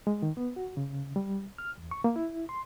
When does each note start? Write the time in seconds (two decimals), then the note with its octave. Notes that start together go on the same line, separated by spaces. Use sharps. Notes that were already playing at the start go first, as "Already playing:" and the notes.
0.07 G#3
0.22 D#3
0.37 B3
0.56 F#4
0.77 C#3
1.16 G3
1.58 F6
1.78 E2
1.91 C#6
2.04 A#3
2.16 E4
2.49 C6